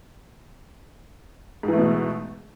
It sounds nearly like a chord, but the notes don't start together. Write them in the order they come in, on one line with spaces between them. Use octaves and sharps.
G#2 E3 A3 B2